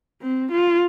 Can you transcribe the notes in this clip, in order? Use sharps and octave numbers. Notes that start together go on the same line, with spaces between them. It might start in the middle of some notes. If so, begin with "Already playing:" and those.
C4
F4